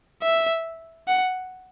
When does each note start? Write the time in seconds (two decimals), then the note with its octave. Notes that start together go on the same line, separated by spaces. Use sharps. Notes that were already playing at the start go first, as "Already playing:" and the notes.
0.23 E5
1.08 F#5